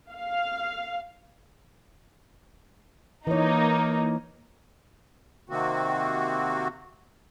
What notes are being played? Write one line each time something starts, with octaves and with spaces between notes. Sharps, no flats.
F5
E3 A#3 D#4 C#5
C3 D#3 A#3 C4 F#4